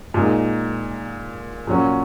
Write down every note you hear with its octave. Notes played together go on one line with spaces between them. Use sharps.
A#2 G#3 D#4
A#2 F#3 C#4